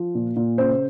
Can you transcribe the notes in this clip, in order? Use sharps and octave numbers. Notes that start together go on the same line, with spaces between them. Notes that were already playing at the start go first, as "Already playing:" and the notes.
Already playing: F3
A#2
A#2
C#3 C5